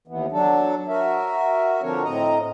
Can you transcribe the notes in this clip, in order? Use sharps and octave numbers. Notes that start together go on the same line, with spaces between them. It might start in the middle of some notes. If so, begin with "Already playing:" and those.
D#2 E3 B3
F#3 D4 A4
F#4 A#4 E5
D3 F3 C4 D4 A#4 C#5
A2 C4 D#5 A#5